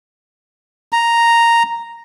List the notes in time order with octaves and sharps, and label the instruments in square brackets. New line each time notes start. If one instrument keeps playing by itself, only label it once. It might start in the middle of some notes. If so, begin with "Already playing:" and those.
[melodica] A#5